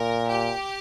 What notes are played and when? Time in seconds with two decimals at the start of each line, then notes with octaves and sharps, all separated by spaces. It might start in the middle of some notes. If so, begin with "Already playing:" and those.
Already playing: A#2 A#4
0.27 G4